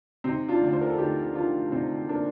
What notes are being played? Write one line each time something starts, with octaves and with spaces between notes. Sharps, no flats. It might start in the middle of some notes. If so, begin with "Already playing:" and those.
C3 C4 D#4
D4 F4
D2 D5
C5
A#4
A4
D2 D#4 G4
D#3 D4 F4
C3 C4 D#4
A#3 D4